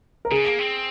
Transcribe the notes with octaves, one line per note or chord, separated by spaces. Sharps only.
A#4
C#3 G#4
A#3
C4